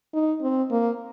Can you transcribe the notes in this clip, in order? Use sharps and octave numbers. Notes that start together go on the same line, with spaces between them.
D#4
C4
A#3